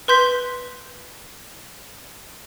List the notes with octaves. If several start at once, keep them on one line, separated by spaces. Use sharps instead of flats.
B4 C6 G6 B6